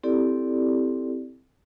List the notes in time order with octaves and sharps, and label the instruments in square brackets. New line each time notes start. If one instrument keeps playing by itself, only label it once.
[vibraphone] C4 E4 G4 A4 D5